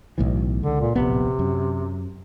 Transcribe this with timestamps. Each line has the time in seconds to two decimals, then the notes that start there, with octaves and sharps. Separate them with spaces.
0.18 B1 A2 E3
0.63 C#2 D3
0.80 A#2
0.95 D1 A#1 C3 B3
1.39 F#2